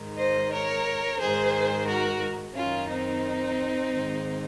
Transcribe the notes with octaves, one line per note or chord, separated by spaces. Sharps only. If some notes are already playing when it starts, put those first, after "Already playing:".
Already playing: G#2 D#3
C5 D#5
A#4 C#5
G#2 D#3 G#4 C5
F#4 A#4
F#2 D#3 C#4 F4
C4 D#4
G#2 D#3